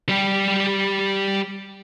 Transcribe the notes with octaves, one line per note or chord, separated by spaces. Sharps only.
G3 G4